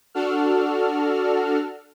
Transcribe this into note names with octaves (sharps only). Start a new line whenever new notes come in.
D4 F#4 A4 F6